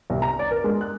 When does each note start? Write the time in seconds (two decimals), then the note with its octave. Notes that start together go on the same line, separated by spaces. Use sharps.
0.10 C2
0.22 A#5
0.39 D5
0.51 A#4
0.64 G#3
0.81 F#6